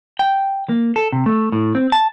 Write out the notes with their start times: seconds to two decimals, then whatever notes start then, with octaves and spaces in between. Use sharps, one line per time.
0.19 G5
0.69 A#3
0.96 A4
1.12 C3
1.26 A3
1.52 A2
1.75 C4
1.92 A5